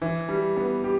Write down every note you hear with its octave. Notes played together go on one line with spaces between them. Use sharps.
E3
G3
B3
G4